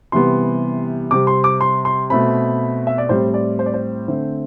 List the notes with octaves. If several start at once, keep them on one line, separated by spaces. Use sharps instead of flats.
C3 E3 G3 B3 C6
C3 G3 C4 D6
C6
D6
C6
C6
B2 A3 C4 B5
E5
D5
A2 G3 C4 C5
D5
C5
D5
C5
D3 A3 C4